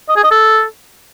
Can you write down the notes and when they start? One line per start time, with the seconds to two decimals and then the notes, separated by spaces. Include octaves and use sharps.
0.09 D#5
0.16 G#4
0.24 D#5
0.31 A4